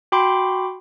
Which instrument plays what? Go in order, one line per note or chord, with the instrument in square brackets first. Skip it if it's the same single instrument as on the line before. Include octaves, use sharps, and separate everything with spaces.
[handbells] F#4 G5 B5 C6 D6